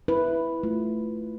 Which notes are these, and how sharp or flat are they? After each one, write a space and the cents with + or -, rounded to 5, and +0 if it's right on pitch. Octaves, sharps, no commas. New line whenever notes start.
E4 +0 B4 +0
A3 +0 F4 +0